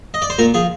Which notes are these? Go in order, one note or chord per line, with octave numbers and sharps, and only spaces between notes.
D#5
D5
C5
A#2 A#4
F3 G#4